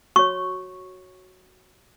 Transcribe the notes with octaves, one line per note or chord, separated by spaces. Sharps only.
F#4 C#5 C#6